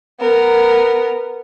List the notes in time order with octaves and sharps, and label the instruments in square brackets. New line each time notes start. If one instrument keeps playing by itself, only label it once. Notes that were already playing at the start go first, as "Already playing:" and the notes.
[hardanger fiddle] B3 A#4